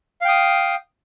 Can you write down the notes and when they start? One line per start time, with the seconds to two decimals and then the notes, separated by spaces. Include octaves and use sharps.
0.21 F5
0.25 G5
0.28 D#6